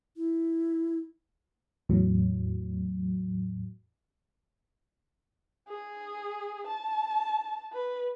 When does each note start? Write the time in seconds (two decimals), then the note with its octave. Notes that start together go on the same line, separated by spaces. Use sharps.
0.17 E4
1.89 E2 A2 F#3
5.68 G#4
6.67 A5
7.73 B4